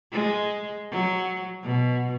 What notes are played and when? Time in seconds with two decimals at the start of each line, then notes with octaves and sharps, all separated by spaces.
0.12 G#3
0.91 F#3
1.63 B2